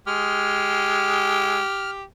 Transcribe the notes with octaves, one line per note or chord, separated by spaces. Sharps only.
G#3 G4 F6